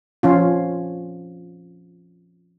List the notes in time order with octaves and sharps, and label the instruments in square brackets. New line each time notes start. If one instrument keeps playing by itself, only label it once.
[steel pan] F3 C#4 F4